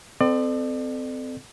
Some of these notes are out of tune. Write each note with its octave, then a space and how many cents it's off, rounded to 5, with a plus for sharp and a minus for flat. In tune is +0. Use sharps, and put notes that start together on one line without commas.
C4 -25 A4 +0 D5 +35